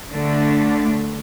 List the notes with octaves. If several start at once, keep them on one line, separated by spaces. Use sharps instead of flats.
D3 A3 D4